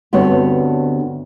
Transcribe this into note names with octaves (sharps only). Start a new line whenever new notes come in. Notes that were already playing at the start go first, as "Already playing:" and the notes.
D2 G2 B3 C4 F#4 C#5